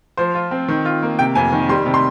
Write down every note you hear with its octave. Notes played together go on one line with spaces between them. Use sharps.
F3 C5
F4
C4
D#3
F4
A#3
C3 G5
F2 G#5
D#3
G3 C6
C3
C6